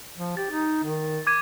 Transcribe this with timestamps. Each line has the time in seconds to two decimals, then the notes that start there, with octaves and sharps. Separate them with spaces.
0.18 F3
0.37 G4 A6
0.51 D#4
0.84 D#3
1.27 D6 G#6 D#7